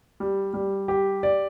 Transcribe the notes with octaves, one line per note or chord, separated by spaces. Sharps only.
G3
G3
G4
D5